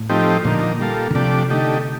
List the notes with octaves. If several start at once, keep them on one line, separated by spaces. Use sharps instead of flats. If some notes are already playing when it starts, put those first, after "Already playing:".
Already playing: A2
F3 A3 C4 D#4 G4
A#2 D3 F3 A#3 D#4
G3 A#3 F4 A4
D3
C3 F3 A3 D4 G4 D5
D3 A3 D#4 G4